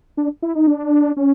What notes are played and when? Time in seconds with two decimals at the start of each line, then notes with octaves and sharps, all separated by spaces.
0.17 D4
0.42 E4
0.55 D#4
0.67 D4
1.17 C#4